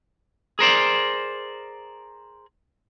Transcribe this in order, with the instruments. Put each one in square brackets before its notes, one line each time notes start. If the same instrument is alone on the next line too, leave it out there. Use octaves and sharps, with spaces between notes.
[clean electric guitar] G#4 A#4 C5 D5